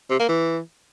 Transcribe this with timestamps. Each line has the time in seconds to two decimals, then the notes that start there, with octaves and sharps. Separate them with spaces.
0.10 C3
0.19 A#3
0.28 E3